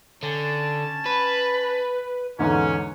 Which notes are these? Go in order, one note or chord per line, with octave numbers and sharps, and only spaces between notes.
D3 C#4 A5
B4
E2 G#2 D3 C#4